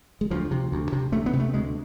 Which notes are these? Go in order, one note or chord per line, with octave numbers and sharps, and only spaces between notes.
G#3
D2 F3
C3
D2
C3
D2 A3
B3
C3
A3
D2 G#3